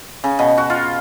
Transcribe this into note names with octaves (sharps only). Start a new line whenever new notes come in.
C#3
B2
F#4
F4